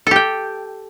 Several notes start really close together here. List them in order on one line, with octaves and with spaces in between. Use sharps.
A4 G4 G5